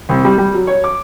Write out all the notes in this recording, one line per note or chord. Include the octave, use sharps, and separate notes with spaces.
C2
G3
G3
F#3
C#5
D6